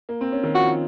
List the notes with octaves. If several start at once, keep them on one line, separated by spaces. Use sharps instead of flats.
A#3
C4
C#4
D#3
F3 F#4